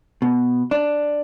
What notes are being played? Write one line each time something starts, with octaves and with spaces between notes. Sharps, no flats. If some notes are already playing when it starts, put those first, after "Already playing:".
B2
D4